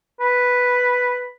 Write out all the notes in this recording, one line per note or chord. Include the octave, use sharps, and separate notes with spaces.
B4